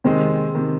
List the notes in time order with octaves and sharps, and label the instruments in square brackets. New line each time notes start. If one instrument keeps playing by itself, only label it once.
[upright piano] C3 D#3 G#3 [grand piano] C4
[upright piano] C3 D#3